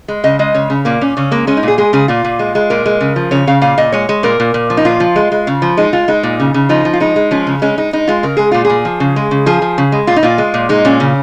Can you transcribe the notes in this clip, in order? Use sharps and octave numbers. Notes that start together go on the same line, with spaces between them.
G#3
C#3 D#5
G#3 D#5
C#3 C#5
C#3
A#2 A#3
A#2 C#4
C#3 C#4
G#3 A#3
G#3 C#4
D#4
A#2 G#4
G#3 G#4
C#3 G#4
A#2 F4
A#2
G#3
G#3
A#2 A#4
G#3
C#3
F3
C#3 C#5
C#3 F5
A#2 F5
A#2 D#5
G#3 C#5
G#3
A#2 A#4
A#2
A#2
F3
D#4
A#2 F4
F3
G#3
G#3
C#3
F3
G#3 D#4
G#3 F4
G#3 D#4
A#2
C#3
C#3
F3 D#4
F3
F4
G#3 D#4
G#3
F3 C#4
C#3
G#3 C#4
G#3 D#4
G#3 D#4
G#3 F4
C#3 A#4
G#3 G#4
A#2 F4
G#4
A#2
F3
C#3
G#3
C#3
F3 G#4
F3
C#3
G#3
A#2 F4
D#4
A#2 F4
G#3
A#2
G#3 D#4
A#2 C#4
C#3